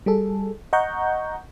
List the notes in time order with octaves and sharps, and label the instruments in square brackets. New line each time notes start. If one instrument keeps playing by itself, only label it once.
[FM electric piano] G3 G#4 A4
D#5 F#5 A#5 C#6 G6